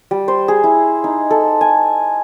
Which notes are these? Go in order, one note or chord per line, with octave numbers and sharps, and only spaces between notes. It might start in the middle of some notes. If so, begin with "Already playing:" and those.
G3
C5
G#4
E4
D#4
A4
G#5